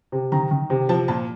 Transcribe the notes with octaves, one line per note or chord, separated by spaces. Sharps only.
C3
D#3 A#5
D#3
C3
F3 A5
A#2 A5